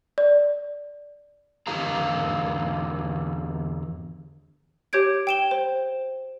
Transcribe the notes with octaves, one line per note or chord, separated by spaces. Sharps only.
D5
E2 D3 E4 G4 F5 A#5
G4 C#5 G6 G#6 D7
G5 E7 G7
C5